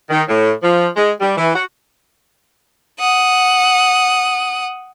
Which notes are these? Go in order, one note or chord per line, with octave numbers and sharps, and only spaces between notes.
D#3
A2
F3
G#3
G3
E3
F#4
F#5 D#6